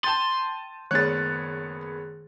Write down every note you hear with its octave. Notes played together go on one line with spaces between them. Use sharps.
G5 A5 C6 G6 A6 D#7
F#1 D#3 B3 G#4 C#5 F#6 A6